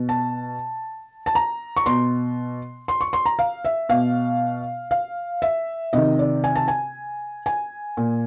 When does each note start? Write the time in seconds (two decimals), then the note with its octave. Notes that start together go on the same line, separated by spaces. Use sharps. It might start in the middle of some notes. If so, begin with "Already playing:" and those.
Already playing: B2
0.09 A5
1.26 A5
1.35 A#5
1.77 C#6
1.86 B2 C6
2.88 C6
3.01 C#6
3.13 C6
3.26 A#5
3.39 F5
3.65 E5
3.89 B2 F5
4.91 F5
5.42 E5
5.93 C3 D#3 D#5
6.19 D5
6.44 G#5
6.56 A5
6.68 G#5
7.46 G#5
7.97 A#2